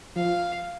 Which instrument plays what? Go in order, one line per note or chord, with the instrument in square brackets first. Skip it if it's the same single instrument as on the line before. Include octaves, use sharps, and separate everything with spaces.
[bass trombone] F3 [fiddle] F5